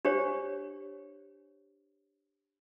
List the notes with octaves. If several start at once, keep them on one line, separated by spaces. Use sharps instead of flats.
D4 G4 C5 C#5